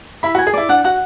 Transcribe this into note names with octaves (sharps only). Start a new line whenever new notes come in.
E4 B5
F#4
G#5
G#4
E4 D5
D4 F#5
F#4 F#5